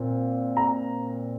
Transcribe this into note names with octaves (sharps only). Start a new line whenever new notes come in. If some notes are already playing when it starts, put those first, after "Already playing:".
Already playing: A#2 C4
A#5